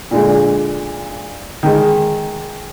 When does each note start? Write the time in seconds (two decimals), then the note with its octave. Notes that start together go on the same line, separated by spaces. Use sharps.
0.11 A#2 D3 G#3
1.63 D#3 G#3